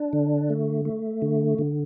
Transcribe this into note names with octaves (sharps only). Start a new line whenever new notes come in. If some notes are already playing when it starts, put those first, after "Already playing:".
Already playing: D4
D3
A3
A3
D3
D3